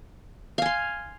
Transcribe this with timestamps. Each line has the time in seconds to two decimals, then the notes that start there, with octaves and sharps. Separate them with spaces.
0.58 F5
0.62 G#5
0.66 C6